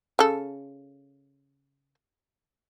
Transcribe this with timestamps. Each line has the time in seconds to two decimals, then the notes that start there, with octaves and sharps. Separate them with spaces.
0.19 C#3 A4